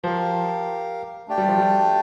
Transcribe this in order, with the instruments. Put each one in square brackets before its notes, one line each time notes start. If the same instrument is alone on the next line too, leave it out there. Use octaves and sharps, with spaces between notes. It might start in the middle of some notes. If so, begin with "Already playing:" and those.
[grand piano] F3 [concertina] G4 A#4 F5
[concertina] A3 D4 G4 D5 G5
[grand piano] G3
F3
G3